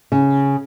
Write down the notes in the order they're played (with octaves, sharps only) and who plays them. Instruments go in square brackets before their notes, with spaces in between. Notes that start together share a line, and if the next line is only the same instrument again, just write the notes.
[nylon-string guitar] C#3